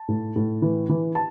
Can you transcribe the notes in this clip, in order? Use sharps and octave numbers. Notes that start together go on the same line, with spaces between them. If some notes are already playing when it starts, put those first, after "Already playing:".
Already playing: A5
A2
A2
E3
E3
A5